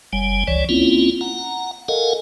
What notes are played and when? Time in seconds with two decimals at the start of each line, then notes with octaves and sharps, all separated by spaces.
0.13 F#1 G3 G#5
0.48 C#2 E3 C#5 D5
0.69 A#3 C4 C#4 E4 F4
1.21 F#5 A#5
1.88 A4 A#4 D#5 F5 F#5 G#5